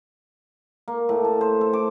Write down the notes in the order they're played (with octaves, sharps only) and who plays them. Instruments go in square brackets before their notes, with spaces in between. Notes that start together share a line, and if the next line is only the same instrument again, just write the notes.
[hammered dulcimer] A#3
A2
A5
C5
A4
D6